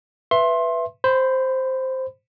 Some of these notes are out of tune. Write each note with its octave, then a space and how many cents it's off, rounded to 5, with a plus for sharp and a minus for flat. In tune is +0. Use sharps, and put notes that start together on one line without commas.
B4 +0 E5 +15 C6 +20
C5 +0 B5 +25